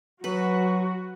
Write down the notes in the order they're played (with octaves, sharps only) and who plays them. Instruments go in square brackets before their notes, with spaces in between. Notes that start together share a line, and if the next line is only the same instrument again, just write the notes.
[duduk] F#3 [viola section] F#4 [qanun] B4